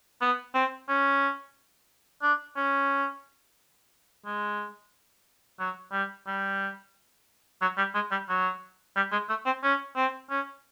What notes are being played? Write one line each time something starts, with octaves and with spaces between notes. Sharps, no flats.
B3
C4
C#4
D4
C#4
G#3
F#3
G3
G3
F#3
G3
G#3
G3
F#3
G3
G#3
A3
C4
C#4
C4
C#4